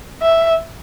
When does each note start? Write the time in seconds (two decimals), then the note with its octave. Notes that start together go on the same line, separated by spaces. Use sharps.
0.23 E5